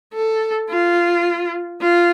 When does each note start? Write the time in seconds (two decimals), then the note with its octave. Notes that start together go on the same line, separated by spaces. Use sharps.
0.13 A4
0.69 F4
1.81 F4